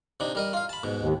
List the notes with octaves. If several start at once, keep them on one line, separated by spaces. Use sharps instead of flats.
C3 D4 D#4
G3 A#4 D#5
F4 F5
A5 B5
G#2 B2
D#2